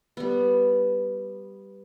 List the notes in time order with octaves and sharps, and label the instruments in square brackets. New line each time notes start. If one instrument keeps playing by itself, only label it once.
[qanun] G3 B3